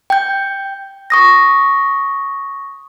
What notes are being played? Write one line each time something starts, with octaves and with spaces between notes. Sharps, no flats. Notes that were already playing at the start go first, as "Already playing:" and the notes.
G5 G6
C#6 D#6 A#6